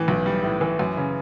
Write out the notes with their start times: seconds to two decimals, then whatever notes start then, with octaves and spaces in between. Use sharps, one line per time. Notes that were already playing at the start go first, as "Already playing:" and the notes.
Already playing: A2 E3
0.08 B1
0.26 G3
0.44 A2
0.61 E3
0.79 F#2
0.97 C#3